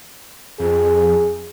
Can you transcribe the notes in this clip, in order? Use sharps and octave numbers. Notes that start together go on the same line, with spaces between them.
F2 G#4